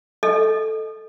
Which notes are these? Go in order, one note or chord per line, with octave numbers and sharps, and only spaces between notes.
A4 D#5